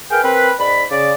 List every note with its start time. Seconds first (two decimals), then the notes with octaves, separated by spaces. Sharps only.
0.10 G#4 A#4 B4 F5 G5
0.23 C4 A#4 B4
0.59 G#2 D5 B5
0.90 C#3 D5